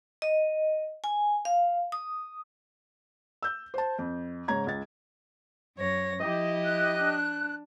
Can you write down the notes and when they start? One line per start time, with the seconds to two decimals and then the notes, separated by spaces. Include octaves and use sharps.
0.22 D#5
1.04 G#5
1.45 F5
1.92 D#6
3.43 E6 G6
3.74 C5 A5
3.99 F2
4.48 G#2 C#3 C#5 A#5 G#6
4.67 C#2 A6
5.77 F#2 C#5 A#6
6.21 F3 E4 G4 D#5
6.65 F#6
6.98 D4